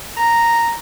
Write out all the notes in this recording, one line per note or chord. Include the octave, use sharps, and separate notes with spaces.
A#5